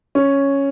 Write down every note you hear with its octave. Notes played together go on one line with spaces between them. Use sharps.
C#4